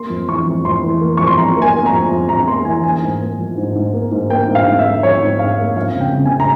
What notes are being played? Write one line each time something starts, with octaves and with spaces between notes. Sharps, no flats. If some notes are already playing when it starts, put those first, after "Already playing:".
Already playing: A#3 C6
F2
E3 C#6
F2
F2 C6
E3
A#3
F2 C#6
C6
F2 A#5
A#3
G#5
A#3
A#5
F2
F2
F2 A#5
A#3 C6
E3 G#5
A#3 G#5
G#2
A#3
F3
G#2
G#2
A#3
G#2
A#3 G5
G#2
F5
G#2
E5
G#2
F3 C#5
G#2
G#2 F5
A#3
F2 F5
C#3
G5
C#3
G#5
A#5